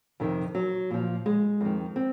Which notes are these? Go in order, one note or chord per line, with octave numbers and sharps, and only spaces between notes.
F2 C3 D#3
F#3
A#2 F3
G#3
F2 D#3
C4